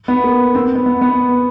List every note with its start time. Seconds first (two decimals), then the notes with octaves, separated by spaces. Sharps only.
0.08 B3
0.24 A#3
0.55 C4
0.75 B3
0.86 B3
1.01 B3